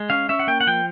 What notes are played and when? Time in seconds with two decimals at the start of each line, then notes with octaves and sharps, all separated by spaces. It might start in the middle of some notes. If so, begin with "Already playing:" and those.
Already playing: G#3
0.10 C#4 F5
0.29 C#4 E5
0.39 F#5
0.47 A#3 G5
0.61 F#5
0.67 F3 G5